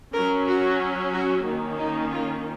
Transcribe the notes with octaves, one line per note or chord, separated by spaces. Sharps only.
F#3 C#4 A#4
F#4
F#4
D#3 A#3 C#4
D#4
F4